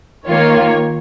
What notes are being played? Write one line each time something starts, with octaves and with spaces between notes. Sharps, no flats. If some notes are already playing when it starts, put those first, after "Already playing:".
D#3 A#3 F4 C#5